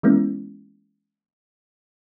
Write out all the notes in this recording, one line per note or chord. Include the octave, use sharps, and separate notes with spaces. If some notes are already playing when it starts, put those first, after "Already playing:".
E3 G#3 A#3 B3 C#4 E4